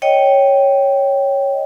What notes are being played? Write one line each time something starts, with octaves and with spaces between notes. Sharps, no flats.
C#5 D#5 G5